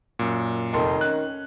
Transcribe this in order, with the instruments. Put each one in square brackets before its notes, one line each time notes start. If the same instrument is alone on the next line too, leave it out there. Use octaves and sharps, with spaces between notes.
[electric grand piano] F#2 A#2
[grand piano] F1 A4 C6 [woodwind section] D#3
[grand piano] C#4 [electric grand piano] F#6